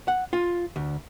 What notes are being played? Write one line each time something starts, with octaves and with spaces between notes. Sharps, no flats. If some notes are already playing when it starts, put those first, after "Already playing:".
F#5
F4
D2